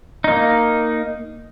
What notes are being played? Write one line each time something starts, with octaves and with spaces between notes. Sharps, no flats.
A#3 D#4